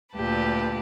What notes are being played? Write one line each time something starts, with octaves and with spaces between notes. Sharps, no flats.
D2 A#2 G4 B4 A5